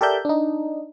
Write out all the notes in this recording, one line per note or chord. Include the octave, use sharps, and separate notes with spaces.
G4 A4 A#4 D5 E5 G6
D4 D#4